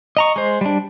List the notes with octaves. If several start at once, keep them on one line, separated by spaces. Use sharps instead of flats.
D#5 A#5 C#6
G#3 C5
G3 D4